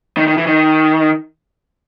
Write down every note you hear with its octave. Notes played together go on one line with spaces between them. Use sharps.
D#3
D#3
E3
D#3